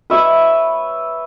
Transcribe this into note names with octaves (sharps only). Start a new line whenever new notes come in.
B4 C#5 E5